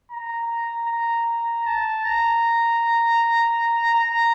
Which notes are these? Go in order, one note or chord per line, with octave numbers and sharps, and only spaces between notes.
A#5
A#5
A5
A#5
A#5